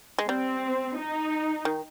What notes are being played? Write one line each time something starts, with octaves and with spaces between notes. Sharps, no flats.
G#3
G3 C4
D#4
D#3